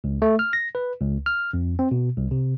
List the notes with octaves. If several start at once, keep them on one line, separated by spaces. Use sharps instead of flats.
C#2
A3
F6
A#6
B4
C#2
F6
F2
C4
B2
C2
C3